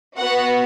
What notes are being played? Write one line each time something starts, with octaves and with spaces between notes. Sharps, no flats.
B3 F#4 F#5